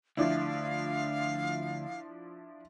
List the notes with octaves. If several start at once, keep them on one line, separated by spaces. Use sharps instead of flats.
D2 F3 D4 E4 F5